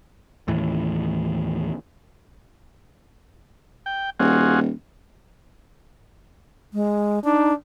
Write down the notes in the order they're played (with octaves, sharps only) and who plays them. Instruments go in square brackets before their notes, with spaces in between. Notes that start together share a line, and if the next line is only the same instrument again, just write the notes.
[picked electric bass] D#2 A2 E3
[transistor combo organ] G5
[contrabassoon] D#1 [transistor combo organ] F4 F#4 G#4
[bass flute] G#3
[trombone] D4 [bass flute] D#4